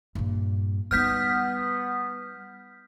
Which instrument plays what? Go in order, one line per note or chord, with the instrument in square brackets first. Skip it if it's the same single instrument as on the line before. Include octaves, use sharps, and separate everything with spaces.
[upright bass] G2 A#2
[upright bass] G3 D#4 [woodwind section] B3 [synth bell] F6 G6 B6